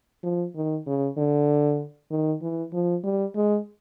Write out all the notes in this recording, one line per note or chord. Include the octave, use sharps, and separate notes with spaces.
F3
D#3
C#3
D3
D#3
E3
F3
G3
G#3